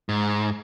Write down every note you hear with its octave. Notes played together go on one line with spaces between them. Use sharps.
G#2